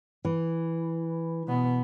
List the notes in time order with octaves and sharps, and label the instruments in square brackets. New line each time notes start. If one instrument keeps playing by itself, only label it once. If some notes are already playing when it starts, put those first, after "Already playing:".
[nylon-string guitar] E3
[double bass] B2 B3